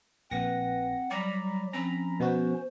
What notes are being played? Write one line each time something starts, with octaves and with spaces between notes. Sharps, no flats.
A#1 C4 B4 F#5 A#6
F#3 G3 D5 A#5 B5
F3 C4 C#4 A#5 B5
B2 B3 F#4 C5